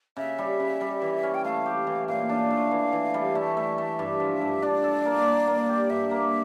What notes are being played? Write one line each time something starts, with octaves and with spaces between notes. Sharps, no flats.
C#3 E5
G3
C#3
G3
E3
C#4
G5
A3 F5
G4
E3
A#2 F5
D4
A3
E3
E3
G3
A3 E5
A3
A3
G2
F3
G2
D4 D5
A4
A#3
A#3
A#3
G4
G2 E5
A#3